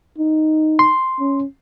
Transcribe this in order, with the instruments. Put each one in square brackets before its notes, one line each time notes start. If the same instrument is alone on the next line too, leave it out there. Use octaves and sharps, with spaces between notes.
[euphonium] D#4
[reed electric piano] C6
[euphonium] C#4